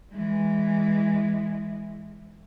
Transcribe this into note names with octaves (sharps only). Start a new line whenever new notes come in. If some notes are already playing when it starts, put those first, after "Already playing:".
E3 G#3